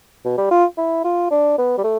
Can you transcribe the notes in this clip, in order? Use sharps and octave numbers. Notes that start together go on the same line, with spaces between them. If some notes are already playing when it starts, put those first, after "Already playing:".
B2
G3
F4
E4
F4
D4
B3
G3
A3